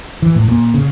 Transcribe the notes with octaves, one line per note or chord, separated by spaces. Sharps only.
E3
A2
A#2
C#3